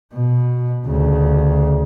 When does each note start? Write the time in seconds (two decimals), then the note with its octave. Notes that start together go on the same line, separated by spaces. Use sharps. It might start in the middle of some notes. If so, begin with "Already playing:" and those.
0.14 B2
0.86 D2 C#3